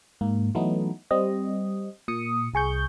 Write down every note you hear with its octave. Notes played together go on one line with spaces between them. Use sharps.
G#2 A#3
E3 F#3 A3 B3 D#4
G3 C4 D#5
A#2 D#6 C#7
C2 G#4 C#6 G6